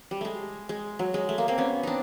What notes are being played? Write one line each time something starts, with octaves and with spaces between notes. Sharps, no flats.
G3
G#3 A3
G#3
F#3
G#3
A3
A#3
A#3 C4
B3 C#4
C4 D4 D#4